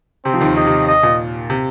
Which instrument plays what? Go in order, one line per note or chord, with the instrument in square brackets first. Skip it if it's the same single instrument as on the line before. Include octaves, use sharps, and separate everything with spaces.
[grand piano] C3 [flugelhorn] C4
[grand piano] F3
D#2 D#3
[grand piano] C3 [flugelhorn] D#5
[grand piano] C3
[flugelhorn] D#5
[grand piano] A#2
C3